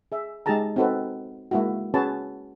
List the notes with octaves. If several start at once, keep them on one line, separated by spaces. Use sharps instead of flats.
G#4 E5
G#3 D#4 G4 G#4 A5 A#5
C4 D#4 F#4 A4 B4
G#3 A#3 D4 E4 F#4
C#4 F#4 G#4 B4 C#5 A5